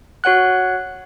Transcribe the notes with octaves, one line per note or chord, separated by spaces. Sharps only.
F#4 C#5 F#5 F#6